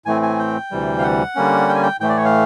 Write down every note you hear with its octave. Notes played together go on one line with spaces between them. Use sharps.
A2 E3 A3 C4 G#5
G#5
G5
D2 C3 E3 G3
F5
F#5
D3 G3 A#3 C#4
G5
G#5
G5
A2 E3 A3 G5
D5
C#5
F5